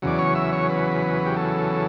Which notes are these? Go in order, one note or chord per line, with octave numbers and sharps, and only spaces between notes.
E2 C#3 F#3 D5
C#5
E5
C#5
B4
G4
A4